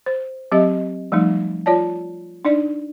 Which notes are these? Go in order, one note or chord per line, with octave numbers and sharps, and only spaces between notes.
C5
F#3 C4 G4 D#5 E5
F3 G3 A3 D#4
F4 C#5 D5 A5
D4 D#4 D5